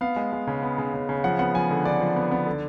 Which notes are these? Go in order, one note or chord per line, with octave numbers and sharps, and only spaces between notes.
B3 F5
G#3
G#3
C#3
B3
C#3
C#3
C#3
F3 F#5
B3 F#5
F3 G#5
D3
D3 D5
F3
B3
B3
D3